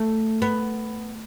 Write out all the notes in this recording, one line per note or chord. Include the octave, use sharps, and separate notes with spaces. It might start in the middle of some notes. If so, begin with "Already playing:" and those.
Already playing: A3
B3